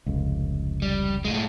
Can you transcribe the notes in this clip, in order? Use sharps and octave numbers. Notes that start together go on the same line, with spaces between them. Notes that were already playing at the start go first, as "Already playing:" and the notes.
F1 C#2
G3
A2 G#3